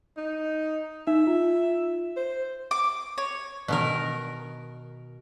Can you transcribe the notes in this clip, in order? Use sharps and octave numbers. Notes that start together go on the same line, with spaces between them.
D#4
D#4 E5
F4
C5
D6
C#5
B2 D#3 A#4